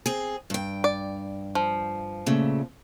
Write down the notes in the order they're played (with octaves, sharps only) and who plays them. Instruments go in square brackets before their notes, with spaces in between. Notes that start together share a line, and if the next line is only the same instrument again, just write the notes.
[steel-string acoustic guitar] C4 G#4
G2 G5
[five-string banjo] D5
F3
[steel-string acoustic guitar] A#2 C#3 A3